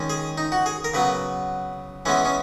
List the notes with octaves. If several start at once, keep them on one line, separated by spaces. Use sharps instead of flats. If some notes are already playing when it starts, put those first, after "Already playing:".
Already playing: D#3 G#3 C#4
G#4
D#4
F#4
G#4
A#4
C#3 F#3 B3 B4
E3 G#3 B3 C#4
C#4